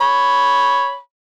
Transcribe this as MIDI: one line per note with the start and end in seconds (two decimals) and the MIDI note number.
0.01 0.93 73
0.01 0.99 83